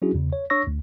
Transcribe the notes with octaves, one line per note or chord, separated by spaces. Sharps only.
F#3 C#4 D4 E4 F#4 G#4
E2 C#3
C#5
D4 C#5 C#6 E6 A#6
D2